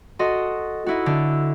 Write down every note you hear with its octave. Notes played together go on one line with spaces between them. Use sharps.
F#4 A4 D#5 C6
D#4 E4 F#4
D3